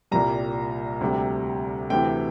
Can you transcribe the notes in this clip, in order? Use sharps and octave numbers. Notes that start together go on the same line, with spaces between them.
C2 A#2 G3 A#5
D2 C3 G3
D2 C3 E3 G5